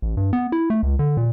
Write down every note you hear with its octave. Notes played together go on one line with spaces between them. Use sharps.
A1
G2
B3
E4
A3
C#2
D3
A#2